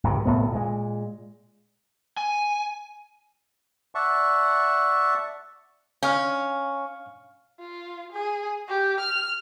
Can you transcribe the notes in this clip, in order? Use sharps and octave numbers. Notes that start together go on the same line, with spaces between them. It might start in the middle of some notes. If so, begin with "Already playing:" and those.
G#1 C#2 C3
G1 C2 A2 B3
A#2 G#3
G#5
D5 E5 F#5 A5 C#6
C#4 F5 F6
F4
G#4
G4
F6